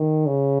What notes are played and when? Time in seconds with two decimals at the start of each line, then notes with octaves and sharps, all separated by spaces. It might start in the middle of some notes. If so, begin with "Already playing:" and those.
Already playing: D#3
0.27 C#3